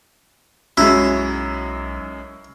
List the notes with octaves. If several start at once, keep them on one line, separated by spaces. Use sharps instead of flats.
B1 F#2 F#3 G#3 E4